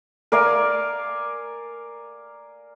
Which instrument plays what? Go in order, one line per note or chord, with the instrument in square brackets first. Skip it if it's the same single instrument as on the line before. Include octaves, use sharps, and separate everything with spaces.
[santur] A#4 D5 F5 G#5